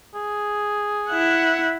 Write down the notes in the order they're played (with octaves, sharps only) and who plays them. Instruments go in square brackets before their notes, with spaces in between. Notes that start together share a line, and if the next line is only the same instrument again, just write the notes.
[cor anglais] G#4
[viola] E4 F#5